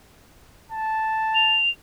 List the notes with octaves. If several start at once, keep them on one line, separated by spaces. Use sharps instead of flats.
A5
F7